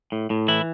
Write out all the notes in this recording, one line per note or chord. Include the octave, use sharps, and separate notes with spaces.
A2
A2
E3 E4